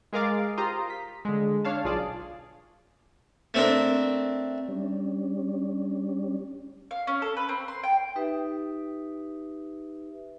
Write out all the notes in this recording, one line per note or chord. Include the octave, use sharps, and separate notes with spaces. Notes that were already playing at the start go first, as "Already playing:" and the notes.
G#3 G#4 A#4 F5 D6 A6
F4 G4 C5 A#5 C6 D#6
B6
D3 G#3
D4 C#5 F5 A5
B1 F4 G#4 D5 A5
A3 C4 D4 A#4
G3 C#4 D4
F5
C#4
A4
B4
C4
C6
G5
D#4 G4 B4 E5